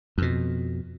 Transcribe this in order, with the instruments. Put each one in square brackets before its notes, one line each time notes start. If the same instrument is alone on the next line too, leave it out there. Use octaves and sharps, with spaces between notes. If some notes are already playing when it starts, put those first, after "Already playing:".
[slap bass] F2 B2